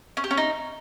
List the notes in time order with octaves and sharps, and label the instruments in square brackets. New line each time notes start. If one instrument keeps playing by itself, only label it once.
[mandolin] C#4
G4
C#4
D#4